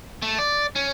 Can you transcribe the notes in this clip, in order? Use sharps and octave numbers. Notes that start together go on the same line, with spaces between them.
A3
D5
C#4